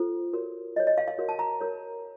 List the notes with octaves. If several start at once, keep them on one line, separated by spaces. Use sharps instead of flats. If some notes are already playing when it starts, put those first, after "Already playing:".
Already playing: F4 A4 C5
F#4 A#4 C#5
F#4 A#4 C#5 D#5
D#5
F5
F5
F#4 A#4 C#5
A5
A#5
F#4 A#4 C#5